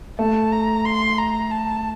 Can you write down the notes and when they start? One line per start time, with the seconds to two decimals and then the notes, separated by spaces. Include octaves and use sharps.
0.19 A3 A5
0.52 A#5
0.85 C6
1.18 A#5
1.51 A5